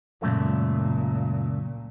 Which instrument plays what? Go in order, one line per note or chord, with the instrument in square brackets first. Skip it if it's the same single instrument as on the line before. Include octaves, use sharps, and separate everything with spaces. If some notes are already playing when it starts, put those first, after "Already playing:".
[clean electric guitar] C#2 F#2 A3 [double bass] A#2